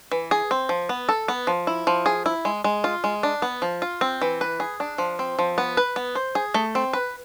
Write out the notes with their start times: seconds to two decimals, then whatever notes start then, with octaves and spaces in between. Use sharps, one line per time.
0.12 E3
0.31 G#4
0.51 C4
0.69 F3
0.89 B3
1.09 A4
1.28 B3
1.47 F3
1.67 E4
1.87 F3
2.06 G#4
2.26 E4
2.45 G#3
2.64 G#3
2.84 F4
3.04 G#3
3.23 D4
3.42 B3
3.62 F3
3.82 F4
4.01 C4
4.22 E3
4.41 B4
4.60 G#4
4.80 D4
4.98 F3
5.19 C4
5.39 F3
5.58 B3
5.77 B4
5.96 B3
6.15 C5
6.35 G#4
6.54 A3
6.75 C4
6.93 B4